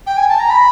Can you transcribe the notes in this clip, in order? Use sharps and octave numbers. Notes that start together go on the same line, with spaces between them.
G5
G#5
A5
A#5
B5